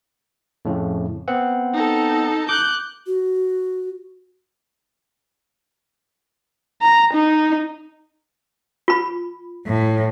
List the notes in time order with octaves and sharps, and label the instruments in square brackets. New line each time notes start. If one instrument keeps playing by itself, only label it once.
[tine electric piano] F2 A2 C#3
B3 C4 F#5
[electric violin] D#4 A4
[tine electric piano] D6 [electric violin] F#6 G6
[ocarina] F#4
[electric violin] A#5
D#4
[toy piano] F4 B5
[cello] A2